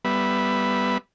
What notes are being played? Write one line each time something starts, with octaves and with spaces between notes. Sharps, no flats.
G3 B3 E5 B5